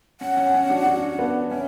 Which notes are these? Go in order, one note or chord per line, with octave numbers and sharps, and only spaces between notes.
C#4 F#5
C#4
C#4
D4 F#4
D4 F#4
B3 D4
C#4 E5